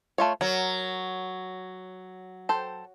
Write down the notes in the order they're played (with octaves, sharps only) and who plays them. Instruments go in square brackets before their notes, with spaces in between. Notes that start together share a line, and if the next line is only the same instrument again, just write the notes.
[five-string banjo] A3 F4 C#5
[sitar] F#3 [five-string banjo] A#4
[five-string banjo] A4 C5 G5